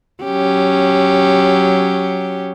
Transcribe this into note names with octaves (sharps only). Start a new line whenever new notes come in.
F#3 C#4 G4